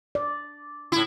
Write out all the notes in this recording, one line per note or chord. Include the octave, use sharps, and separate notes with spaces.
D5
A2 E4